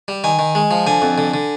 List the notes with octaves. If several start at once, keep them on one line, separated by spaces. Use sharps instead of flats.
G3
D#3 G#5
D#3
G#3
F3
D3 G#5
F2
D3
D3